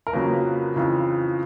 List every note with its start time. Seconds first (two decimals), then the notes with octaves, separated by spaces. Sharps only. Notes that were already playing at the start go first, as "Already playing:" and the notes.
0.07 A#4
0.13 F2 C#3 F#3 A#3 B4
0.76 F2 C#3 E3